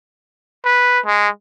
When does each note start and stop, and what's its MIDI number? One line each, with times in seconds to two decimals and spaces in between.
0.65 1.00 71
1.06 1.29 56